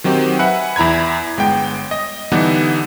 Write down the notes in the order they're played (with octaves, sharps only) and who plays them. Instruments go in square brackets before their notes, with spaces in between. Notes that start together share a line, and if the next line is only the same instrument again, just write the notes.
[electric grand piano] D#3 F#3 C4 D#4 G4
B4 E5 F#5 G#5
E2 E4 A#5 B5 G#6
G1 G#3 B3 G5
D#5
D3 E3 G3 B3 D4 D#4